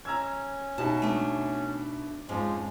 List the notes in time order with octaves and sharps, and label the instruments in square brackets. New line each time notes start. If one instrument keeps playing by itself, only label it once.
[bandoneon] C#4 [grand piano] A#5 E6 G#6
[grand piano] B2 D#4 E4 [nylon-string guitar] A5
[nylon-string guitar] A3 B3 D4
[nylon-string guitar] F2 G#2 C#4 [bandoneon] F3 G#3